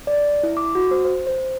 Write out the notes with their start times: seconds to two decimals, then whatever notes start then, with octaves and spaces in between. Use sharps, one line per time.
0.07 D5
0.43 E4
0.57 D6
0.75 F#4
0.91 C5
1.04 C5
1.27 C5